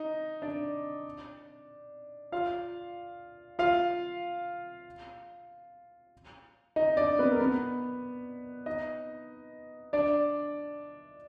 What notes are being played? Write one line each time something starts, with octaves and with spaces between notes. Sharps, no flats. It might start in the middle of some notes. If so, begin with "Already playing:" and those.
Already playing: D#4 D#5
D4 D5
F4 F5
F4 F5
D#4 D#5
D4 D5
B3 B4
A#4
B3 B4
D#4 D#5
D4 D5